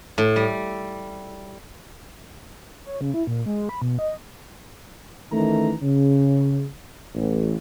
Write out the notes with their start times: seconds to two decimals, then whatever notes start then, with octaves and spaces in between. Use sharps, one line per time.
0.18 A2
0.36 G3
2.86 C#5
3.01 C#3
3.14 E4
3.27 A#2
3.46 G#3
3.69 B5
3.82 B2
3.99 D#5
5.32 D#3 E3 A3 C#4 A#5
5.82 C#3
7.14 A1